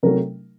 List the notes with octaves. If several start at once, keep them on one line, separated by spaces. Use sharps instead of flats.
C3 F#3 A3 A#4